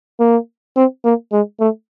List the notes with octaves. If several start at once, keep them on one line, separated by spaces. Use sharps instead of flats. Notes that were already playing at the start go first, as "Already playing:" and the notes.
A#3
C4
A#3
G#3
A3